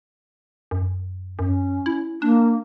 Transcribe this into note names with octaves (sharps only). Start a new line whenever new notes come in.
F#2
F#2 C#4
E4
A#3 D4